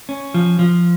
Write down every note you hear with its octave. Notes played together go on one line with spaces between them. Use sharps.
C#4
F3
F3